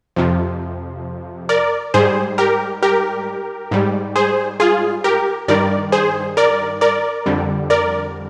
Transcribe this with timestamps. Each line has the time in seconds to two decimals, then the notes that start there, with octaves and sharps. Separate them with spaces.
0.16 F2 C3 F3
1.49 A#4 D5
1.94 G#2 G3 G#4 C5
2.38 G4 A#4
2.83 G4 A#4
3.71 G#2 G3
4.16 G#4 C5
4.60 F4 G#4
5.04 G4 A#4
5.48 G2 D#3 G3 A#4 D5
5.92 G#4 C5
6.37 A#4 D5
6.81 A#4 D5
7.26 F2 D3 G3
7.70 A#4 D5